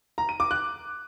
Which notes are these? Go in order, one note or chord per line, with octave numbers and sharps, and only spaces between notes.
A#5
D#7
D6
F#6